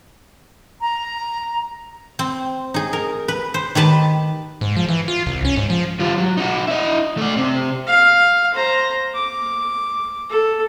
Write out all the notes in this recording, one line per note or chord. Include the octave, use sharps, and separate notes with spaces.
A#5
C4
D#4 G#4
A#4
B4
C5
D#3 G4 B4 A5
G#2
F3
E3
F4
C2
C#4
G#2
F3
G3 F4
F#3
D#4 F#4
E4 D#5
A3 D5
C3 C4
F5
C5 A#5
D6
A4